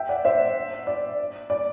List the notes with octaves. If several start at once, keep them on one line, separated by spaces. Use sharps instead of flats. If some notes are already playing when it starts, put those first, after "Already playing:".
Already playing: E5 G5
D5 F#5
C5 E5
D5
D5